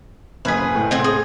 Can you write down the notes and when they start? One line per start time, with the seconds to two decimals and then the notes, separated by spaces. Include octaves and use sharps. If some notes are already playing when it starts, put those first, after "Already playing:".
0.45 F#1 G#4 B4 G#6 B6
0.75 A2
0.91 C4 G#4 F#5
1.04 G#4